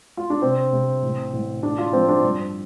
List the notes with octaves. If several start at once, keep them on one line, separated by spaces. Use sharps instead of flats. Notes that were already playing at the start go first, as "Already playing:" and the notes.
F4
D4
C3 C4
C3
A1
A1
D3 D4
F4
F3 C4
D4
G2